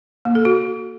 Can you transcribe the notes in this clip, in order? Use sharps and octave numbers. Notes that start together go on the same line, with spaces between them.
A#3
A4
F#4